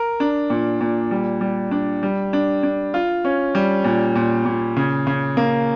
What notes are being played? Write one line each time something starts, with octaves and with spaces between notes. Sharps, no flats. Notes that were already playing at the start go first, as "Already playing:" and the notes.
Already playing: A#4
D4
A#2
A#2
G3
G3
D4
G3
D4
D4
F4
C#4
G3
A#2
A#2
A#2
C#3
C#3
A#3